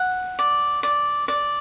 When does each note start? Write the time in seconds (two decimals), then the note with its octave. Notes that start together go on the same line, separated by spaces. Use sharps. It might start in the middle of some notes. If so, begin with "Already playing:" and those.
Already playing: F#5
0.39 D5
0.83 D5
1.28 D5